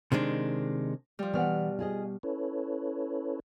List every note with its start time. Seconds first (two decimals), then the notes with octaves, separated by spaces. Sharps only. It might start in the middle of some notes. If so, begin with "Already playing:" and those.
0.12 C3 D#3 G#3 D4
1.19 F3 G3
1.33 B2 E3 D5 F#5 F6
1.79 F4 G#4 D#5
2.23 C#4 E4 A4 B4 C#5